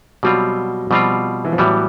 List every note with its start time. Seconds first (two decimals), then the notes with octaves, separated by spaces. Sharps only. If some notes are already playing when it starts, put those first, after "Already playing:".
0.23 B2 F#3 G3 C4 F4
0.90 B2 F3 G3 C4 F4
1.45 E3
1.52 F3
1.58 A2 E3 F#3 G3 B3